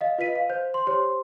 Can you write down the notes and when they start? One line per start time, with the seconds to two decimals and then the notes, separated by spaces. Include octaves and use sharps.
0.01 D#5 F5
0.18 F4 B4 D#5 B6 D#7
0.36 F5
0.49 C5 G6
0.74 C6
0.87 G4 C5 C#5 C6